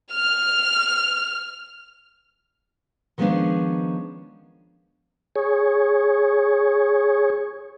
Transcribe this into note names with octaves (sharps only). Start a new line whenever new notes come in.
F6 F7
D#3 F3 G#3 B3 C#4 D4
G#4 C#5